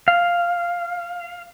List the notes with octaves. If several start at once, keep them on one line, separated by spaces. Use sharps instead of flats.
F5